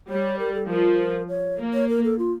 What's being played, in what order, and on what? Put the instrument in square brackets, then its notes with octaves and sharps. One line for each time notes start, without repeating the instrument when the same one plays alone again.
[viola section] G3 [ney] C#5
[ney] A#4
A4
[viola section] F3 [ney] A#4
[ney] C#5
[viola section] A#3
[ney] C#5
A#4
A4
F4